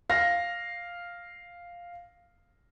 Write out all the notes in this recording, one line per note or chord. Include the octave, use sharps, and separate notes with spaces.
F5 A#6